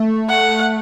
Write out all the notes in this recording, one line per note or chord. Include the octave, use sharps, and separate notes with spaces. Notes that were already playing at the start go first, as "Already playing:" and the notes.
Already playing: A3
F#5